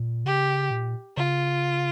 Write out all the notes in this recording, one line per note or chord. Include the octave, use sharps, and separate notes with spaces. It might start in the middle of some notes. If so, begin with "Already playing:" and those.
Already playing: A#2
C#3 G4
A#2
C#3 F4